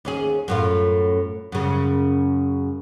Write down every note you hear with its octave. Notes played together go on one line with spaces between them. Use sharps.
D#2 C#4 G#4
F#2 A2 F4
F#2 C#3